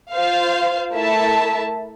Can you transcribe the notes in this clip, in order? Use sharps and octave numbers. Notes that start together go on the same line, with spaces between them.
F4 C5 F5
A3 E4 A#4 E5 A5